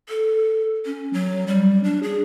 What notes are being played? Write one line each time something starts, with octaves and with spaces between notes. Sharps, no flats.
A4
C#4
F#3
G3
D4
G#4